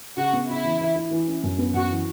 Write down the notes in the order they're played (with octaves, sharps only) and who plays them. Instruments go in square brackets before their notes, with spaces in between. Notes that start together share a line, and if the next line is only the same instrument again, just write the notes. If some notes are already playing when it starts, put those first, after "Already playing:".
[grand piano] C#3 [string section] F#4
[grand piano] B3
[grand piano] C#3 [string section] E4
[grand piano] E3
E3
E4
E3
C#4
F#2
B3
[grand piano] F#2 [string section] F#4
[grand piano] E3